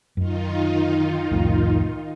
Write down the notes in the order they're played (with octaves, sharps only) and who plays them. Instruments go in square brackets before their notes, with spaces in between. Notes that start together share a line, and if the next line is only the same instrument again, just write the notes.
[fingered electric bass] F#2 [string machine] D#3 D#4 F4
[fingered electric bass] C2 F2 A2